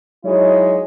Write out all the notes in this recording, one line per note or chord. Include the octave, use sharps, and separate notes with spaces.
F#3 G#3 D#4 E4 C#5